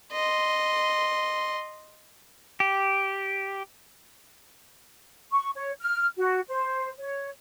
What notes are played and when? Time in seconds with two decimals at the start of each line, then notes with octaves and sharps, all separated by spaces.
0.12 D#5 C6
2.60 G4
5.31 C#6
5.56 C#5
5.80 F6
6.17 F#4
6.49 C5
6.99 C#5